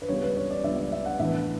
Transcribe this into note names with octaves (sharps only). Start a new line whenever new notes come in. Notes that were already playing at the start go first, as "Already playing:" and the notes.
B4
C#2 C#3 G3 B3 C#5
B4
C#5
D5
C#2 C#3 G3 B3 E5
D5
E5
F#5
A2 E3 B3 D4 E5